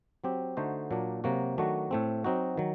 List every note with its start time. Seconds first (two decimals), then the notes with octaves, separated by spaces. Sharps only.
0.24 F#3 C4 G4
0.57 D3 A3 D#4 F#4 C5
0.91 A#2 F#3 A#3 D4
1.24 C3 F#3 A#3 F#4
1.58 D#3 F#3 A3 D4 F#4
1.91 A2 A3 C4
2.24 F#3 C4 D#4 F#4
2.57 D#3 F#3